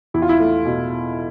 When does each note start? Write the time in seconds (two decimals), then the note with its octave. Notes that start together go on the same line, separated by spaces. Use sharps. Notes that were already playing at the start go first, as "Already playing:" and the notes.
0.14 E2 E4
0.22 F4
0.29 E4
0.40 A3
0.65 B2